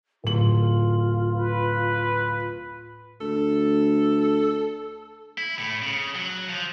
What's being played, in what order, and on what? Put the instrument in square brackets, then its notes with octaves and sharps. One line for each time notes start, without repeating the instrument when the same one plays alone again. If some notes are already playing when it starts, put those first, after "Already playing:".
[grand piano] D1 F#7 [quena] F4
[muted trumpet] B4
[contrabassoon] D2 [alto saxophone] A4
[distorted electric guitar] E4
A2
C#3
F#3
F3